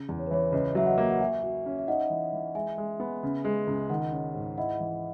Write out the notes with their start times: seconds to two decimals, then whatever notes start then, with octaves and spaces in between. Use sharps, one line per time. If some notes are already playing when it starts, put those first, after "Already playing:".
Already playing: C#3
0.09 E2
0.19 C#5
0.27 B4
0.31 E3 C#5
0.52 C#2 B4 D#5
0.75 F#3 E5
0.86 D#5 F#5
0.98 A#3
1.10 F#5
1.20 F#4 E5 G#5
1.43 F#4
1.66 C#4
1.79 E5
1.88 D#4 D#5 F#5
2.10 E3
2.33 E3
2.55 G#3 E5 G#5
2.78 G#3
3.00 B3
3.23 C#3
3.45 G#3
3.67 C#2
3.90 D#3 D#5 F#5
4.12 C#4
4.34 G#2
4.58 E4 D#5 F#5
4.80 E3